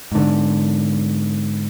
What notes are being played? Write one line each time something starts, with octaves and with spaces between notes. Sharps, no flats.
G#2 D3